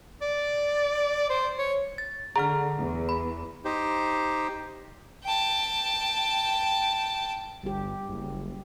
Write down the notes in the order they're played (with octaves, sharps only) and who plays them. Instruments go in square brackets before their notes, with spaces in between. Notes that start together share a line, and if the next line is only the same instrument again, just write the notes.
[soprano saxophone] D5
C5
C#5
[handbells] A6
[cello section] D3 [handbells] G#4 F#5 F6 [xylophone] A#5
[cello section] E2
[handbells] B5
[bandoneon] D#4 G4 C5
[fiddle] G5 A5
[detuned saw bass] G1 [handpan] G3 G4
[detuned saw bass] F#1